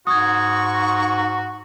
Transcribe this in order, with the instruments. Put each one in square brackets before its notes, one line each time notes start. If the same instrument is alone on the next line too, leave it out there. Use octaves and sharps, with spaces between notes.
[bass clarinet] G#2 [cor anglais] F#4 [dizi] C#6 [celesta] D#6 G#6